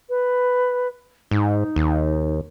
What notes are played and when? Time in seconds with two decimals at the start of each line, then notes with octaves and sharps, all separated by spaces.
0.09 B4
1.31 G#2 D#4
1.76 D#2